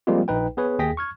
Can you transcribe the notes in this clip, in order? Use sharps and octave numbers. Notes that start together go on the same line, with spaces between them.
F3 G3 G#3 A#3 C4 F4
A#1 D#4 B4 G5
B3 G#4 B4 C#5
D#2 G#4 G5 A#6 B6
C#6 F6 G#6